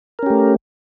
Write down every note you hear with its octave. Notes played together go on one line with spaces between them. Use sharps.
A3 C#4 G4 A#4